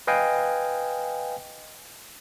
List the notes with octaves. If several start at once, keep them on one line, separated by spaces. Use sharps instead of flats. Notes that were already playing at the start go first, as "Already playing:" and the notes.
B4 D#5 F5 G5 G#5